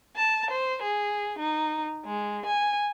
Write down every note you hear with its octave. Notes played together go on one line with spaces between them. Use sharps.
A5
C5
G#4
D#4
G#3
G#5